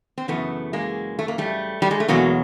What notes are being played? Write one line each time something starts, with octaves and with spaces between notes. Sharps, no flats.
C4
F#2 C#3 E3 A3 B3
G#3 A#3
A3
A#3
G3 A3
G3
G#3
A3
E2 B2 F#3 G#3 A#3